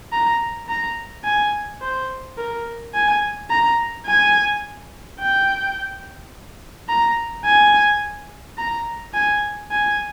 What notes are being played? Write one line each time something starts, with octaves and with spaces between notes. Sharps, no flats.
A#5
A#5
G#5
C5
A#4
G#5
A#5
G#5
G5
A#5
G#5
A#5
G#5
G#5